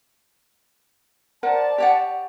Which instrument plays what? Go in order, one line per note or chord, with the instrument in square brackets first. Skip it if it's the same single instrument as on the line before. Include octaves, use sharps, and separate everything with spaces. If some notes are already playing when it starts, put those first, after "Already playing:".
[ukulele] A#4 C5 F#5 [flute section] D5 A5
[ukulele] G4 C#5 F#5